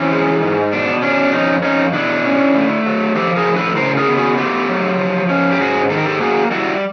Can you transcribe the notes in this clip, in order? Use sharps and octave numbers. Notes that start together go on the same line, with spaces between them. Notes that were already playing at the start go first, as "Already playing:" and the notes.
Already playing: E3 C4 C#4
G#3
G#2
B2 D4
C#4 D4
D4
F2 C#4 D#4
F2 C#4 D#4
B2 D4 E4
C#4
A3
F#3
F3 G4 A4
G#4 A#4
A2
A4 B4
C#3 A#4 C5
G#4 A#4
B3
F#4 G#4
A3 F4 G4
F#3
F3
C#4
G4
G#2 F#4 G#4
D#3 A4
A#4
G4 A4
A#3 F#4 G#4
G3 E4 F#4